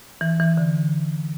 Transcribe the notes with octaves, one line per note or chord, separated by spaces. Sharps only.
E3
E3
D3